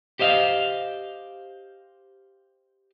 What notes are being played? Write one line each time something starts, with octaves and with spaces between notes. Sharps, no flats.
G4 C5 D#5 F5